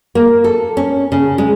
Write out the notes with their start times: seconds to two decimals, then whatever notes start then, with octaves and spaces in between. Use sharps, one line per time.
0.15 A#3
0.44 A4
0.77 C#4
1.12 C#3
1.38 G#3